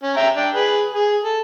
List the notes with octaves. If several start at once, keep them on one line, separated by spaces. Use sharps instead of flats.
C#4
E5 G5 A#5
D4 G5
G#4 B4
G#4
A4